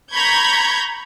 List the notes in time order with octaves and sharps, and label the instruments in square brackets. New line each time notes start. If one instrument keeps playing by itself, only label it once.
[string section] A#5 B5 C#6 G6 G#6